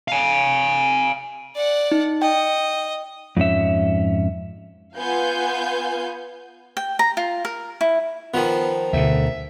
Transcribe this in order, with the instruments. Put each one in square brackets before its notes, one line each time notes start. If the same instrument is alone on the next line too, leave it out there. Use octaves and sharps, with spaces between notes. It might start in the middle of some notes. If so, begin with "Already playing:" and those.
[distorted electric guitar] F5 G#5
[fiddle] D5 F#5
[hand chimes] D#4
[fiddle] D#5 [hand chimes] G5
[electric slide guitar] F2 G#2 C#4 E5
[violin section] B3 F4 F5 G#5 G6
[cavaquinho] G5
A#5
F4
A#4
E4
[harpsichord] D#3 F3 [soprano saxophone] B3
[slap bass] D2 B2 [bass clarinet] D3 [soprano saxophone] E5